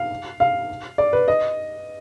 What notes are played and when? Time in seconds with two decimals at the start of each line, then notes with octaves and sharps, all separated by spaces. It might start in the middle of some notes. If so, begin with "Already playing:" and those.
Already playing: F5
0.40 F5
0.98 D5
1.13 B4
1.28 D#5